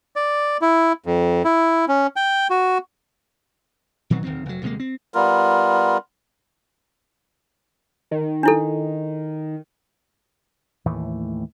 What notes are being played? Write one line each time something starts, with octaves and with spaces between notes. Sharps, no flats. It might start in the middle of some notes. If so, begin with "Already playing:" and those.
D5
E4
F2
E4
C#4
G5
F#4
A#2 D#3 F#3 C4
D1 G1 D#3 C4
F1 F#3
D#1 C3 G#3 A#3
C4
G3 B3 F4 A#4
D#3
D4 E4 A4
D#2 A2 E3 A3